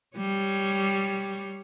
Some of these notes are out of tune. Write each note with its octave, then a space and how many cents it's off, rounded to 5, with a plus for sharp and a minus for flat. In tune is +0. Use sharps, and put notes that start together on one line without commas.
G3 +0 C#5 +0